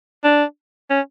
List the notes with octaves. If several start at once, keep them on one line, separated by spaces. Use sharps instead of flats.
D4
C#4